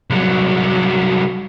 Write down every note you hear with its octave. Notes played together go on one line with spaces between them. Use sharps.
C2 F#3